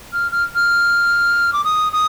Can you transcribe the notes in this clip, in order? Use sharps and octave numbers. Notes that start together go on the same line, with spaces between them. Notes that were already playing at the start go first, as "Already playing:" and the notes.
F6
F6
F6
D6
D#6
D#6